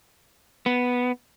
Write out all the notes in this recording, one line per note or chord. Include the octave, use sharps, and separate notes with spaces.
B3